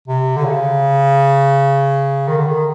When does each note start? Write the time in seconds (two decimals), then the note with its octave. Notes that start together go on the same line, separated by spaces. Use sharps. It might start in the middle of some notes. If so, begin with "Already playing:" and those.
0.08 C3
0.37 D3
0.45 C#3
2.28 D#3
2.38 D3
2.47 D#3